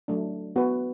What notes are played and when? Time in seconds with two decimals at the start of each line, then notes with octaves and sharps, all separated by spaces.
0.08 F#3 A3 D4
0.56 B3 F#4 B4